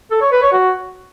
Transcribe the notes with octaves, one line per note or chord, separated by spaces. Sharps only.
A4
C#5
B4
C#5
F#4